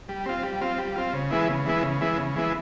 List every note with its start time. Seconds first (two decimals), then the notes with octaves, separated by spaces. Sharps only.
0.09 G3
0.26 C4 F4
0.43 G3
0.61 C4 F4
0.78 G3
0.96 C4 F4
1.13 C#3
1.31 E3 G#3 B3 E4
1.48 C#3
1.66 E3 G#3 B3 E4
1.83 C#3
2.01 E3 G#3 B3 E4
2.18 C#3
2.36 E3 G#3 B3 E4